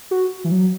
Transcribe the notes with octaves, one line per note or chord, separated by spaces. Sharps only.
F#4
E3
F#3